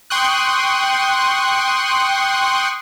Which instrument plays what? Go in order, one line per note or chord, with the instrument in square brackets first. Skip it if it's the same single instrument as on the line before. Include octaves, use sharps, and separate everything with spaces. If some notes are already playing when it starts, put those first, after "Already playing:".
[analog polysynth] G5 C6 C#6 D#6 F#6